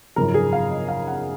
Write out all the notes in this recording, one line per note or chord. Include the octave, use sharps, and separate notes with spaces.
G#1 F#2 C#3 F3 A#4
G#4
F5
D#5
F5
F#5